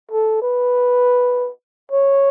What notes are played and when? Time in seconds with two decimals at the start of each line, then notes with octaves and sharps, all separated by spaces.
0.11 A4
0.42 B4
1.92 C#5